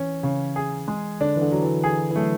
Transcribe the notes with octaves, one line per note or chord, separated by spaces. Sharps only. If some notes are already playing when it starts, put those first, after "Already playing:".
Already playing: E3 C#4
C#3
G#4
G#3
D3 D4
E3
D3
F#3
E3
G#4
E3
F#3 A3